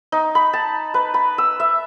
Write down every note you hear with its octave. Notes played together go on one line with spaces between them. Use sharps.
D#4
B5
A5
B4
B5
E6
E5